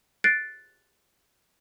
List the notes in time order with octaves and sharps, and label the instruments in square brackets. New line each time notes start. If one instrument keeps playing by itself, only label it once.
[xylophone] F#6 A6 C7 D7